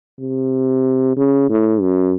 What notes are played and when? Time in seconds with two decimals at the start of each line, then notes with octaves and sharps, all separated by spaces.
0.19 C3
1.17 C#3
1.49 A2
1.81 F#2